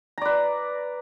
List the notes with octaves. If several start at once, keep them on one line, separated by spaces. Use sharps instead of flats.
B4 D5 A#5